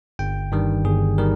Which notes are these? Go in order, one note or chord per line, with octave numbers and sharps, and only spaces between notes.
G1 G5
G2 D#3 G3
G1 G#4
D#3 G3 A#4